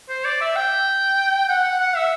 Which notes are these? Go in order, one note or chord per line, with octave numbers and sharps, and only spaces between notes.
C5
D5
E5
G5
F#5
F#5
F#5
E5